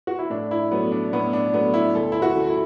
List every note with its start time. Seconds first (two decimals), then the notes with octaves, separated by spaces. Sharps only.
0.07 F#4
0.19 E4
0.30 A2 D4
0.51 E4
0.71 F#3 A3 B3
0.92 D4
1.13 A2 B3
1.33 D4
1.53 F#3 A3 B3
1.74 E4
1.95 D2 A4
2.12 E4
2.22 F#4
2.35 D3 A3
2.49 E4